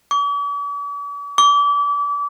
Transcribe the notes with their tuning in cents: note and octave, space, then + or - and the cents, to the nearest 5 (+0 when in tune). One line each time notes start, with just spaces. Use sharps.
D6 -45
D6 -30